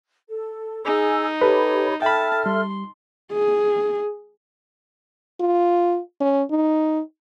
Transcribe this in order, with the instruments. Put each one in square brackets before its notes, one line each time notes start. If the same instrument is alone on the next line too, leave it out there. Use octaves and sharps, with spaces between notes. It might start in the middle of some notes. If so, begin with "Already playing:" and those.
[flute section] A4
[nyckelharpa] D#4 [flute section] G#4 G#5 E6
[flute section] G4 C#5 B5 [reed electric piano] A4 B4
[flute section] A4 E5 F6 [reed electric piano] G5 B5 [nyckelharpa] A5
[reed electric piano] G3 [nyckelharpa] C6
[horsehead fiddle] G#4
[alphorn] F4
C#4
D#4